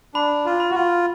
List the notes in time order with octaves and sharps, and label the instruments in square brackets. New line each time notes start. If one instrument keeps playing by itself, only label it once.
[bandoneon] D4 [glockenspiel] B5
[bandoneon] F4
[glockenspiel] B5
[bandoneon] F#4
F4